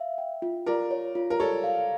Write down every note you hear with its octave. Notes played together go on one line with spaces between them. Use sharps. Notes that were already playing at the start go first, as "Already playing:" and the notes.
Already playing: E5 F5
G5
F4
F4 A#4 D5
C#5
F4
A#4
A4 C#5 D5
F5